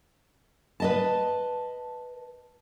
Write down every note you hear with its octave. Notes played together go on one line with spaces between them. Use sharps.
B4 D#5 A5